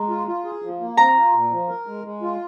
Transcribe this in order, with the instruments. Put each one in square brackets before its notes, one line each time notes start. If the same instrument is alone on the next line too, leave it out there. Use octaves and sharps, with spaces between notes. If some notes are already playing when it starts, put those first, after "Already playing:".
Already playing: [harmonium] G#3 [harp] A#5
[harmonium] F4
F4
G#4
F3
A#3
[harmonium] C4 [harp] A#5
[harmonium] F4
A#2
F3
A#4
G#3
G#3
F4